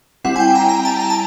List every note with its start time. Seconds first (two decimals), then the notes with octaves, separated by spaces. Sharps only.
0.24 G3 C4 E4 F#5
0.36 G#5
0.40 G5
0.55 A#5
0.69 A#5
0.85 A5
1.00 A#5
1.10 A5